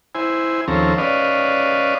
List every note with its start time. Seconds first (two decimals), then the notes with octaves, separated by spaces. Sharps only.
0.15 E4 C5 G#5
0.68 D#2 F3 C4 C#4 A4 A#5
0.98 C#4 B4 D5 D#5 F5